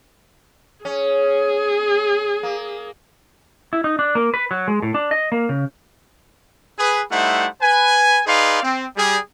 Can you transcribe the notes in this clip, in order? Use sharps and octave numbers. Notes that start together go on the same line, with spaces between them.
C#4 G#4
A#3
E4
D#4
D4
A#3
B4
F#3
G#3
A2
D4
D#5
A#3
C#3
G#4 B4
G3 A3 D#4 E4 C5 F#5
B4 G#5
D#4 G#4 B4 D5 F5 C6
C4
G3 G4 G#4